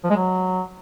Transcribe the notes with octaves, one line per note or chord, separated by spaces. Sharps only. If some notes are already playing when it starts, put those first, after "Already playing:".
F3
G#3
F#3